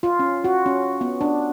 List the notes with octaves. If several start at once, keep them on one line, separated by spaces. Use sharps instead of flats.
F4
C#4
F#4
C#4
B3
D4